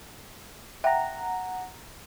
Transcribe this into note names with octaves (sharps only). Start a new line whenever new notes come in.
E5 F#5 G5 A#5